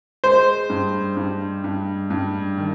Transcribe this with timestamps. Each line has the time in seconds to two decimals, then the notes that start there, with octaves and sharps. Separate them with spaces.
0.24 G#3 C5
0.70 G2
1.17 G2
1.64 G2
2.10 G2
2.58 D#3